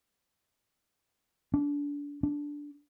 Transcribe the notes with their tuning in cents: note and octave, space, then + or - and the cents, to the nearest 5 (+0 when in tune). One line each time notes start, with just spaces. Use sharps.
D4 -30
D4 -10